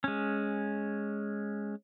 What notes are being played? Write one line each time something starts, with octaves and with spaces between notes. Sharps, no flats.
G#3 C#4